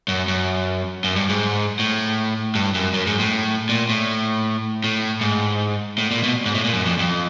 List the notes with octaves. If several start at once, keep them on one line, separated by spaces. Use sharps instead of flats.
F#2
F#2
F#2
G2
G#2
A2
G2
F#2
F#2
G#2
A2
A#2
A2
A2
G#2
A2
A#2
B2
G#2
A2
A#2
F#2
F2
F2